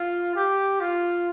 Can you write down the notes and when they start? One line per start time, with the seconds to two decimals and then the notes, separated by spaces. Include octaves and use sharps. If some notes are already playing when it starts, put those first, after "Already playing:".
Already playing: F4
0.35 G4
0.80 F4